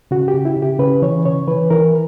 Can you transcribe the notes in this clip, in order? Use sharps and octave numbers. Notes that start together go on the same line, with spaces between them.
C#3 F#4
G4
C#3
E4
C#3
G4
C#3 B4
E3 C#5
C#3 C#5
E3 B4
E3 A#4